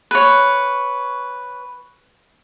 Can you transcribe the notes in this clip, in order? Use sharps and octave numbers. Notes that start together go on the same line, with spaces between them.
B4 C#5